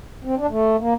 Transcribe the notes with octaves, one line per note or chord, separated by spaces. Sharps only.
C4
D4
A3
A#3